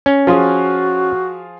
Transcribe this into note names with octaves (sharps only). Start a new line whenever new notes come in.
C#4
F3 F4 F#4 G#4